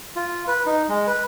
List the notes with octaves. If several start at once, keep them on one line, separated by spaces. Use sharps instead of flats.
F4
B4
D#4
G#3
B4